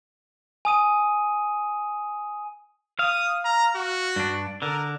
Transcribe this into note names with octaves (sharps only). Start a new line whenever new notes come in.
G#5 D#6 D#7
F5 D#6
A#5
F#4
G2 D4
D3 A#4